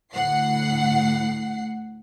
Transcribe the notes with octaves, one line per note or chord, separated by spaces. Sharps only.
D2 A2 F#5 C7